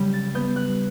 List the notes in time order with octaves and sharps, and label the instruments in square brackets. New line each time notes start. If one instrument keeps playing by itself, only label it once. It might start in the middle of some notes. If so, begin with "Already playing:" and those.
Already playing: [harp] C#3 G3 G6
A6
B3 G6
F#6